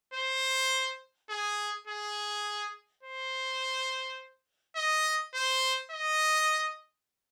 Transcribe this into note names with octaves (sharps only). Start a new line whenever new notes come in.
C5
G#4
G#4
C5
D#5
C5
D#5